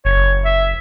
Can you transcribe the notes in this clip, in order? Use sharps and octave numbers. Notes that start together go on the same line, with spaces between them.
F#1 C#5
E5